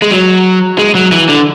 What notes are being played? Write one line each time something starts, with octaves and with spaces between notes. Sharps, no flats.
G#3
F#3
G#3
F#3
E3
D3